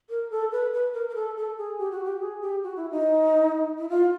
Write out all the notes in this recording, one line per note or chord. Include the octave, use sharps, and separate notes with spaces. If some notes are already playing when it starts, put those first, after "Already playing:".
A#4
A4
B4
B4
A#4
A#4
A4
A4
G#4
G4
F#4
G4
G#4
G4
F#4
E4
D#4
E4
F4